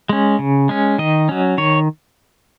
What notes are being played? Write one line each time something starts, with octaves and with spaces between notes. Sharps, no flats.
G#3 C#4
C#3
G#3 C#4
D#3 D#5
F#3 C#4
D#3 C#5